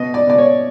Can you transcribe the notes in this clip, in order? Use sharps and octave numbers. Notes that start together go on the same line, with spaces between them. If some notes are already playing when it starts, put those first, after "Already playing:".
Already playing: B2 D#5
D5
B2 D5
C#5